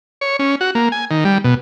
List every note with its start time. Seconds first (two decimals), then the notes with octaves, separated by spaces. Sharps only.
0.21 C#5
0.39 C#4
0.61 F#4
0.75 A#3
0.92 G#5
1.11 D#3
1.25 G3
1.44 B2